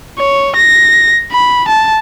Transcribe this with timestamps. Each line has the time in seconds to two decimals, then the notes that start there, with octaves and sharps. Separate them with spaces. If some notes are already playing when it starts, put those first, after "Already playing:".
0.18 C#5
0.56 A#6
1.32 B5
1.68 A5